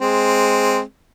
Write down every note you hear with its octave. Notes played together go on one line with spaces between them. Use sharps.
G#3 C4